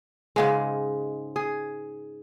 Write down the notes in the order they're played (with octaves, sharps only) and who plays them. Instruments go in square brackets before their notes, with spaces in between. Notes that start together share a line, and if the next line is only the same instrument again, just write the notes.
[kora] G#2 C#3 G#3
G#4